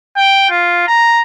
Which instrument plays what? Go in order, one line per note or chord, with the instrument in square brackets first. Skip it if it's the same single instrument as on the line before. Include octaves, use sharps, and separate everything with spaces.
[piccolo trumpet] G5
F4
A#5